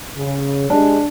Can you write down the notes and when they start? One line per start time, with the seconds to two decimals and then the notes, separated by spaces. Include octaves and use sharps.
0.17 C#3
0.70 G#3 D4 G4